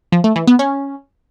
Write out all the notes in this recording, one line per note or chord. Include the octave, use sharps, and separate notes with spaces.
F3
A3
E3
B3
C#4